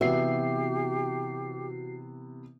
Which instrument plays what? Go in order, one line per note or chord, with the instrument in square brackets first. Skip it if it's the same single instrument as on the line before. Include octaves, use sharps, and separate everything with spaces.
[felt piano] C3 E3 B3 [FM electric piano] F#4 C7 [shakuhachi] G4 [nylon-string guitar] E5